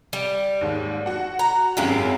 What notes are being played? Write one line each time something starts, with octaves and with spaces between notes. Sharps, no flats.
G3
D#2 G#2
F#4 F#5
A#5
G#1 F#2 G#3 E4 F4 G4